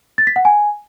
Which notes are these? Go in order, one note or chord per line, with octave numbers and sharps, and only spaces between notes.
A6
B6
F#5
G#5